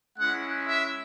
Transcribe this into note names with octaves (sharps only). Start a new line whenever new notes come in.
G#3 C#4 E4 F#5
E5